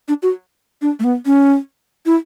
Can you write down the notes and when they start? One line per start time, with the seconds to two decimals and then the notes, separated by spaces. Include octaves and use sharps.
0.08 D4
0.23 F#4
0.82 D4
1.00 A3
1.04 B3
1.26 C#4
2.06 E4